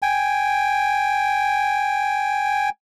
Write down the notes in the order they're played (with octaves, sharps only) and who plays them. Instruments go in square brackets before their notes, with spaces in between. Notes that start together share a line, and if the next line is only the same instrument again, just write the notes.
[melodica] G5 G#5